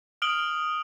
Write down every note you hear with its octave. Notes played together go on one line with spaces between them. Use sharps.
D#6 F6 D7 F#7 G7